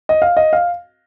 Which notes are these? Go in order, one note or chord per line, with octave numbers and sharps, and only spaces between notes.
D#5
F5
D#5
F5